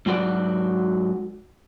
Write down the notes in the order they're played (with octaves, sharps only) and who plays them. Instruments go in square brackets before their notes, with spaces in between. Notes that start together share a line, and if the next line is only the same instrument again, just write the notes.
[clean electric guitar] G#2 F#3 F#4 B4 D5